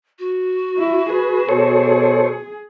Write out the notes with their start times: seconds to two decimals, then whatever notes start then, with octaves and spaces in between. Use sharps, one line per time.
0.19 F#4
0.78 E4
1.10 G#4 B4
1.49 B2 A4 C5 C#5